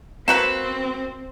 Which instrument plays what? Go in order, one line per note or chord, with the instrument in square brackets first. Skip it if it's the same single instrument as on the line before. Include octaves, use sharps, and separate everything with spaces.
[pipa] A#3 F#4 B4 [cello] C4 [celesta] E7